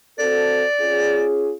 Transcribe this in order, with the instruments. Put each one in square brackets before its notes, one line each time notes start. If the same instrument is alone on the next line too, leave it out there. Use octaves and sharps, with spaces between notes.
[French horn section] C4 F#4 A4 [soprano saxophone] D5
[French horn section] C#4 F4 G#4